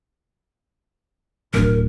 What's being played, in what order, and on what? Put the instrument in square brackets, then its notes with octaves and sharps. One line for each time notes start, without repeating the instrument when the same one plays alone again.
[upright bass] D1 D4 [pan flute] A#4